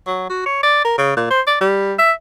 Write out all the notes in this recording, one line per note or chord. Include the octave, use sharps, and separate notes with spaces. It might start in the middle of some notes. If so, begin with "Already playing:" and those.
F#3
F#4
C#5
D5
A#4
C#3
A#2
C5
D5
G3
E5